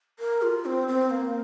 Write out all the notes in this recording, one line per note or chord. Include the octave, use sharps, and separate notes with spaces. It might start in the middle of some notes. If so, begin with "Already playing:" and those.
A#4
F4
C4
C4
A#3